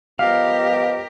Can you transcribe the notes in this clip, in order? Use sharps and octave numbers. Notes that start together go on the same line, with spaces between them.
F3 B3 G4 A#4 D#5 F5